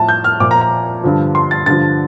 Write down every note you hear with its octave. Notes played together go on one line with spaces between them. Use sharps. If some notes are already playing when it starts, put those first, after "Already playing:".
Already playing: A2 F3 A5
G6
F6
A#2 F3 D6
A#5
A#5
G2 D3 F3
C6
A6
G2 D3 F3 A6